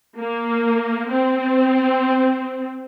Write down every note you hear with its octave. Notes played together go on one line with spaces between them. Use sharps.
A#3
C4